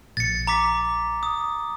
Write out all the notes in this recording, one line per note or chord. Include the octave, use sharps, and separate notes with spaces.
A#1 A6 C#7
A#5 D6 B6
D#6